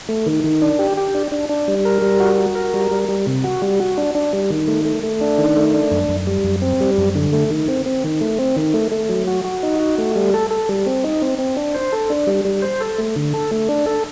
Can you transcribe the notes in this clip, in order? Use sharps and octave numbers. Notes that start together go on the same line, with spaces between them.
A3
D#3
D#3
D4
G4
G4
D4
D4
D4
G3
A#4
G3
F#4
F#4
A#4
G3
G3
G3
C3
F#4
G3
F#4
D4
D4
G3
D#3
A3
A3
A3
D4
D#3
A3
D4
F#2
F#2
G3
F#2
C4
G3
F#2
D3
A3
D#3
C4
C4
D#3
A3
C4
D#3
A3
A3
F#3
F#4
F#4
D#4
F#4
A3
G3
A4
A4
G3
C4
D#4
C4
C4
D4
C5
A4
D4
G3
G3
C5
A4
A3
D3
A4
A3
D4
A4